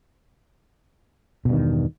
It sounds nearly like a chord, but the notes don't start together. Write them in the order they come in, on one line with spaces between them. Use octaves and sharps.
B2 G2 D#3 E2